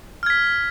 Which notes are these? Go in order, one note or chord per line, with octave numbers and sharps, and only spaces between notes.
F6 G#6 B6